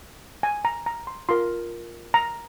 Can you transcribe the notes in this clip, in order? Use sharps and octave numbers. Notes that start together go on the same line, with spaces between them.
G#5
A#5
A#5
C6
F4 A#4 C6
A#5